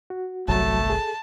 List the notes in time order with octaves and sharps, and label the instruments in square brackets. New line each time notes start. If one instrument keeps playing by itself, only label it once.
[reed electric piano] F#4
[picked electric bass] G1 C2 [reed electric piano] F#3 [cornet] A3 [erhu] A5
[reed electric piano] G#4 A4